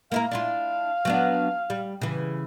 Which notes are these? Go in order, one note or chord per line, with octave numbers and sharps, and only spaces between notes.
A#3 E4 A#4 F5
D4 E4 F4
F#3 B3 D4
G3
C#3 E3